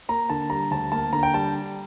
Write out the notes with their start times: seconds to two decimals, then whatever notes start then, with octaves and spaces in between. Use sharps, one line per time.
0.09 A#3 A#5
0.29 D3 A5
0.50 G3 A#5
0.71 D2 A5
0.92 A#3 A5
1.13 D3 A#5
1.23 G5
1.34 G3 A5